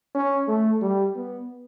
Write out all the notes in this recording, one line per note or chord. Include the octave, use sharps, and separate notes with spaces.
C#4
A3
G3
B3